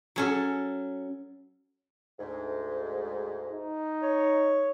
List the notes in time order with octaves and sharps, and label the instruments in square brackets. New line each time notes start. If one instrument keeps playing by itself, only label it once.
[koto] F#3 C#4 A4
[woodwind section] D2 G#2
[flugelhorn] D#4
[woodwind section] C#5